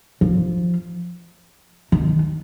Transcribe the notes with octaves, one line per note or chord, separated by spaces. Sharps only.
F3
D#3